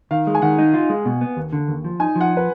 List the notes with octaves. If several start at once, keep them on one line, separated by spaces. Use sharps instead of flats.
D#3 F5
G#3
G#5
D#3 F#5
D#4
F4
G#3
B2
B3
D#2
D3
D#2
F3
D#4 G#5
F3
F#5
B4